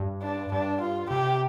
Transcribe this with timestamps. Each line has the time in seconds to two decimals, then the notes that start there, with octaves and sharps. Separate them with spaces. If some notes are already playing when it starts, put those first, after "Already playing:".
Already playing: G2
0.23 D4
0.52 G2 D4
0.81 F4
1.10 C3 G4